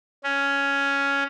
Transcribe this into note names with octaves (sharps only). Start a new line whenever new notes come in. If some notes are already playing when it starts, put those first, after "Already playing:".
C#4